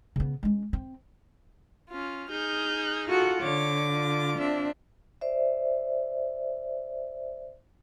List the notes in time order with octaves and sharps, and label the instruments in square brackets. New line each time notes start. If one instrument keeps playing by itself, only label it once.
[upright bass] C#3 B3
G#3 C#4
C4
[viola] C#4 F4
[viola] D#4 G#4 [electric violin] F6 G6
[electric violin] F4 A4 [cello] F#4 F#5
[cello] D3 [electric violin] C#5 [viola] D6
[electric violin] F4
[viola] C4 E5 [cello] D4
[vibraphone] C5 D5 E5